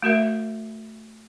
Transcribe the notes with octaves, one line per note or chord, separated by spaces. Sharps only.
A3 F#4 A#4 E5